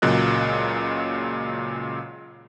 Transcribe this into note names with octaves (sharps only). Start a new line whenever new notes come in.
C#2 A#2 C#3 F#3 D#5 F#6